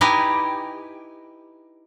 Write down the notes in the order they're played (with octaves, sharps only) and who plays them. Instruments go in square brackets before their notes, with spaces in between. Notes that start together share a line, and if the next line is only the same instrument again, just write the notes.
[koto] D#4 E4 G4 B4 G#5 A#5